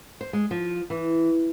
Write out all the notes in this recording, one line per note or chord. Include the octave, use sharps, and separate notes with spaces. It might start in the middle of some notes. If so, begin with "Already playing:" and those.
C5
G#3
F3
E3